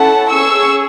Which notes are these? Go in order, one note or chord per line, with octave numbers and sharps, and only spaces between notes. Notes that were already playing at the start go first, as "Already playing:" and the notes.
Already playing: C#4 E4 A4 F#5 A5
C#4 G#4 C#6 E6